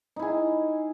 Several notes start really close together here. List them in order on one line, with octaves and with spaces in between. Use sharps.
D#4 E4 G#4